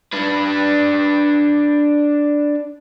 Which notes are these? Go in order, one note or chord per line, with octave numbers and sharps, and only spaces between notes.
D4 B4